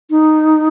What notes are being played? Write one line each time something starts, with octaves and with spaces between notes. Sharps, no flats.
D#4